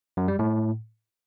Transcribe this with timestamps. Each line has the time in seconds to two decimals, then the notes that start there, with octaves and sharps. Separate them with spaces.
0.17 F#2
0.28 G3
0.39 A2